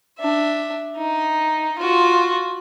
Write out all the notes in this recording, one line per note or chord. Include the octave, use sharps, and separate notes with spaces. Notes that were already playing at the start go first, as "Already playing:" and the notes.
D4 E5
D#4
F4 F#4